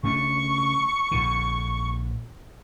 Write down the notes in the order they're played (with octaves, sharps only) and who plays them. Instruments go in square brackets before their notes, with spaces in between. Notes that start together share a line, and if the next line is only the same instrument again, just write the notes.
[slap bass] C#3 A3 D4 [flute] C#6
[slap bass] A#1 D3